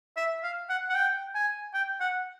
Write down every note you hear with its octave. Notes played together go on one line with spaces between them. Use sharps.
E5
F5
F#5
F#5
G5
G#5
G5
F#5